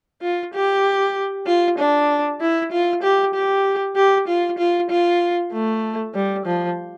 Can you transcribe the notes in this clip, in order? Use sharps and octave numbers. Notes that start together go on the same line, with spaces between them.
F4
G4
F4
D4
E4
F4
G4
G4
G4
F4
F4
F4
A3
G3
F3